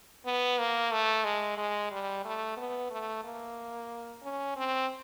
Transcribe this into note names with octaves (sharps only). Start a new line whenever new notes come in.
B3
A#3
A3
G#3
G#3
G3
A3
B3
A3
A#3
C#4
C4